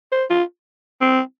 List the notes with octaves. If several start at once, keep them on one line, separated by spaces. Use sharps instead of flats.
C5
F4
C4